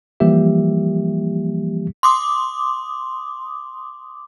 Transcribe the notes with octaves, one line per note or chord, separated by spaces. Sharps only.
E3 F3 G3 A#3 G4 E5
C6 D6 D#6